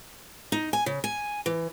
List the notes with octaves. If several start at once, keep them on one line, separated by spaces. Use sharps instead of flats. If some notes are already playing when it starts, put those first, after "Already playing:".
D#4
G#5
C#3
G#5
E3